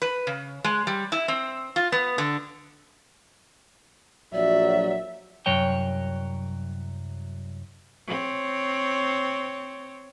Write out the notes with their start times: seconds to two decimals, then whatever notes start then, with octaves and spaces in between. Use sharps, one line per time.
0.02 B4
0.27 C#3
0.64 G#3
0.87 G3
1.12 E4
1.28 C4
1.76 F4
1.92 B3
2.18 D3
4.34 A#1 F#3 D5 E5
5.46 C2 F#2 F#3 C#5 G5
8.07 C4 C#5